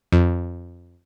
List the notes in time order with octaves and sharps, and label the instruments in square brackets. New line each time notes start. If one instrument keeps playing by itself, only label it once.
[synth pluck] F2